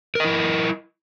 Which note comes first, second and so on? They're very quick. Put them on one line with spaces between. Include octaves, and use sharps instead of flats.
A#4 D#5 E4